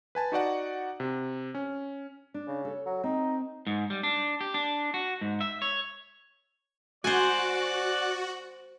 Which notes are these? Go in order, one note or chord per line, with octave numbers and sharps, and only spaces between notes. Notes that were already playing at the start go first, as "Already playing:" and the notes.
B4 G#5 A5
D#4 F#4 D5 F#5
C3
C#4
D4
C#3
A4 C#5
F#3
C4 D#4
G#2
G3
D4
G4
D4
F#4
G#2
E5
C#5
F#4 C5 D5 G#5 F#6